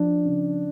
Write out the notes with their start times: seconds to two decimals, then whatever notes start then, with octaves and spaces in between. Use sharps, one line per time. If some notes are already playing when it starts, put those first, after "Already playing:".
Already playing: F3 D4
0.25 C#3